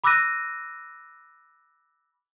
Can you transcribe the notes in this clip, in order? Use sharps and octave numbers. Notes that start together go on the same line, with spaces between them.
B5 D6 E6 F#6 A#6 D#7